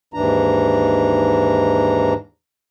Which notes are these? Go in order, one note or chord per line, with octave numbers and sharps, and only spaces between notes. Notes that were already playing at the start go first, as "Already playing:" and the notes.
D#2 G#2 E3 D4 A#5